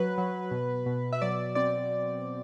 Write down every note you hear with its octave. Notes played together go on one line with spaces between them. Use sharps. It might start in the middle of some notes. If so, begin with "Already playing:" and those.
Already playing: F#3 B4
F#3
B2
B2
E5
F#3 D5
C4 D5